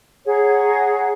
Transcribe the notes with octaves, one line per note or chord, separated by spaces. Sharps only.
G#4 C#5 F#5 A#5